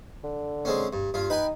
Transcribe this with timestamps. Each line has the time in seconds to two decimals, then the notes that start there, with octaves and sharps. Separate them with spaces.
0.23 D3
0.65 G#3 C4 C#4
0.93 G2
1.14 G2 F4
1.30 D#4 B4 G5 G#5